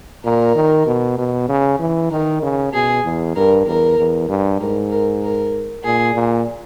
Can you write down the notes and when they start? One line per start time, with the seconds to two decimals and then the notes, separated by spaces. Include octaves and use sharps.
0.24 A#2 A#4
0.55 D#3
0.86 B2
1.17 B2
1.48 C#3
1.79 E3
2.10 D#3 A#4
2.42 C#3
2.73 B2 G#4
3.04 E2
3.36 G2 A#4
3.66 E2 A#4
3.98 E2
4.29 G2
4.60 G#2 A#4
4.90 A#4
5.23 A#4
5.84 A#2 G#4
6.15 A#2